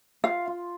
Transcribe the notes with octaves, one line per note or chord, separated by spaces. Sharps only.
F4 F5
F4